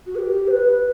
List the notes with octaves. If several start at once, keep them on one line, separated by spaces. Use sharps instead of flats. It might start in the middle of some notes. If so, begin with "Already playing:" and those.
F#4
B4
G4
C5
B4